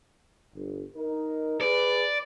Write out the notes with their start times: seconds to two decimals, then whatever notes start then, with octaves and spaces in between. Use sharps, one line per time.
0.55 G1
0.95 D#4 A#4
1.61 G#4 B4 D5